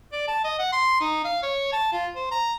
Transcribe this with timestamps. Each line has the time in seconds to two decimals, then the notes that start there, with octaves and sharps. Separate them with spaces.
0.13 D5
0.28 A5
0.44 D#5
0.59 F#5
0.73 C6
1.01 D#4
1.25 F5
1.43 C#5
1.73 A5
1.93 F4
2.16 C5
2.32 A#5